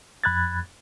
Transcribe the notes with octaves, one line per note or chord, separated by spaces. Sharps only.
F2 B5 F#6 G#6 A6